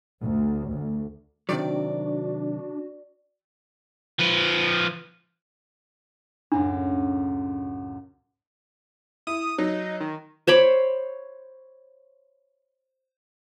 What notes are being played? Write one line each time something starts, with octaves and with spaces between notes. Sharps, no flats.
D2
D2
C3 D#3 F#3 D4 F#4 D5
F3 B4
C#2 F#2 A2 D4
E4 D#6
F#3 D#4
D#3
C5 C#5 B5 D6